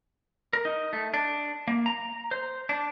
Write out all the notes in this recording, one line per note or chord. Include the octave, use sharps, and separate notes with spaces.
A#4
D#4
A3
D4
A#3
A#5
C5
D4